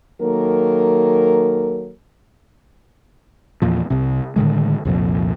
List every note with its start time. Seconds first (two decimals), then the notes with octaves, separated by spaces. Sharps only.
0.22 D#3 F#3 A#3 A4 A#4
3.62 E2 A#2 F3
3.90 C2 C3
4.36 A2 D3 D#3 G#3
4.85 C2 F2 A#2 F3